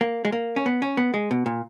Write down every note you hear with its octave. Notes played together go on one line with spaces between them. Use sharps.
A#3
G#3
A#3
C#4
B3
C#4
B3
G#3
B2
A#2